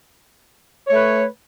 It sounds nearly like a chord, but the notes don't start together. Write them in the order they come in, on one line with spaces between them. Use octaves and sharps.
C#5 A3 B4